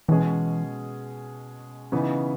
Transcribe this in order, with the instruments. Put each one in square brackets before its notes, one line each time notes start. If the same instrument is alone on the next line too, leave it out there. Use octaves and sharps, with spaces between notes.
[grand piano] B2 G#3 C#4 G#4 [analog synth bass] E3
[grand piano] C#3 E3 B3 D#4